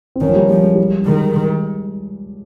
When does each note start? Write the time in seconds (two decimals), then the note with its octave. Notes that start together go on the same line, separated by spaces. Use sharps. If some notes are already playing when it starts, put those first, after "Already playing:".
0.16 C4
0.21 D#3 C#4
0.29 F3
0.36 G3
0.49 F3 G3
0.62 G#3
0.75 G3
1.06 D#3 G#3